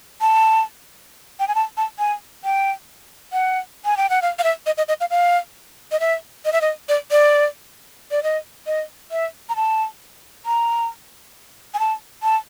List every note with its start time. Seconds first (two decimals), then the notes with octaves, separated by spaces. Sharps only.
0.21 A5
1.40 G5
1.48 G#5
1.55 A5
1.77 A5
1.99 G#5
2.44 G5
3.32 F#5
3.85 G#5
3.97 G5
4.10 F#5
4.22 F5
4.39 F5
4.44 E5
4.66 D#5
4.78 D#5
4.88 D#5
5.00 F5
5.11 F5
5.92 D#5
6.00 E5
6.45 D#5
6.53 E5
6.61 D#5
6.89 D5
7.11 D5
8.11 D5
8.23 D#5
8.67 D#5
9.11 E5
9.49 A#5
9.56 A5
10.46 A#5
11.74 G#5
11.79 A5
12.23 A5